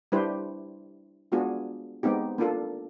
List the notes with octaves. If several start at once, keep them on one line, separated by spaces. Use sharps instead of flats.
G3 D4 E4 G4 B4 C5
G#3 B3 D4 F4 F#4 G#4
G#3 B3 C4 D#4 G4
A#3 D4 F4 A4